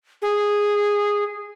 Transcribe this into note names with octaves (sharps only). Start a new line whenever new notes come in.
G#4